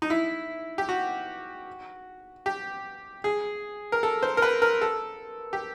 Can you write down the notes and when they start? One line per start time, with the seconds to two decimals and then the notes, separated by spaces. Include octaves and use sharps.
0.02 D#4
0.10 E4
0.78 G4
0.89 F#4
2.46 G4
3.24 G#4
3.92 A#4
4.03 A4
4.23 C5
4.37 A#4
4.42 B4
4.62 A#4
4.82 A4
5.53 G4